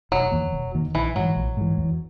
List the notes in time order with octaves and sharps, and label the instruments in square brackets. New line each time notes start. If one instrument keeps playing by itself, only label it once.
[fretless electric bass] E1 [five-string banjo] F#3
[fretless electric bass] E2 D#3 A#3
E1
E2 D#3 A#3
[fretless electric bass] A#1 [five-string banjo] E3
[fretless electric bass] G#2 E3 [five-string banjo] F#3
[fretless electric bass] A#1
G#2 E3
E2